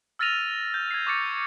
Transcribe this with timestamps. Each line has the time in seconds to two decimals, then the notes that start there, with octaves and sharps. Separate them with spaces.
0.19 E6 F6 A6 A#6 D#7 F7
0.74 G6
0.91 G#6 C7
1.07 C#6 D6 A6 C#7